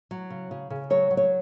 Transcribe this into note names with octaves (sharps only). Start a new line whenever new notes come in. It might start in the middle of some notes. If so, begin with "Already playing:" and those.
F#3
C#3
C#3
C#3
F#3 C#5
F#3
C#5